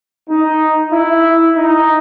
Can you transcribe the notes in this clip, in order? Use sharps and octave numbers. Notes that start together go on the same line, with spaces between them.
D#4
E4
D#4